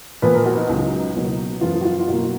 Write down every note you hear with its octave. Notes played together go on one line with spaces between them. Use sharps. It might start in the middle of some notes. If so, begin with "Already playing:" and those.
A#2 F3 B3 B4
A#4
F#4
D#4
C#2 C#3 F#3
B2 F#3 A#3
F#2 F3 B3 F4
F#4
F4
F4
B2 F#3 A#3 F#4